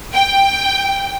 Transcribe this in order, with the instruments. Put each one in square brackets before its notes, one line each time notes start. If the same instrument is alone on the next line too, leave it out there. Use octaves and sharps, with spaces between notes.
[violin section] G5